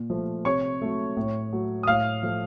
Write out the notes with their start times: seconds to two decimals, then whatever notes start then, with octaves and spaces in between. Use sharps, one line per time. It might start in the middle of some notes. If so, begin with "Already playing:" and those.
Already playing: A#2
0.10 F3 A3
0.45 C3 C#5 C#6
0.82 F#3 A3
1.17 A2
1.52 F#3 A3
1.83 D#6
1.87 A2 F5 F6
2.23 F3 A3